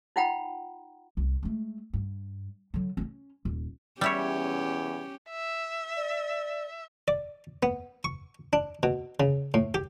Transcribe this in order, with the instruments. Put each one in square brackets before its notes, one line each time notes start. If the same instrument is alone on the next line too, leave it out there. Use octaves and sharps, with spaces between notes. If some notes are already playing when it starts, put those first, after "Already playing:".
[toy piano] D#4 F4 F#5 G5 A#5 B5
[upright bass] C2
G#3 A3
G2
D3 F#3
B3 C#4
D#1
[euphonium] E2 [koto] G3 E4 C#5 [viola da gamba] C#4 G4
[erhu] E5
[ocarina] D5
[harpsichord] D5
B3
C#6
D4
B2
C#3
A2
G4